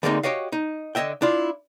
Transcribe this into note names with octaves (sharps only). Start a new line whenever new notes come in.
D2 D3 G#3 A#3 C4 D#4
F#4 G4 C#5 D#5 F5
D#4
D3 C#5 D#5 E5 G5
D4 E4 F4